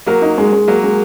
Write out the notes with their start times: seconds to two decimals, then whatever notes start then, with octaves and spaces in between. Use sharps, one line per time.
0.06 F#3 A#3 A#4
0.22 D#4
0.38 G#3
0.52 G#3
0.68 F#3 A#3 A#4
0.83 G#3